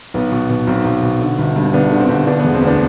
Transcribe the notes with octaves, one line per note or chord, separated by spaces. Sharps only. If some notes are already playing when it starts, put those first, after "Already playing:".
B1 B3
B2
B2
B1 C4
B1
B2
D3
G1
G2
G1 B3 D4
D3
C4
G1
D3 B3 D4
E1 B3
C4
D2 B3 D4